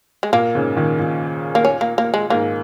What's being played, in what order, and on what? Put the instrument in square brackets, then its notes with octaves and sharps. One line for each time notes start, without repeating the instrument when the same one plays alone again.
[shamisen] G#3
[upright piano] A#2 [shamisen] A#3
[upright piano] G#2 C#3
A#2 D#3
A#2
[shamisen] A#3
C#4
A#3
A#3
G#3
[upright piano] G#2 [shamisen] A#3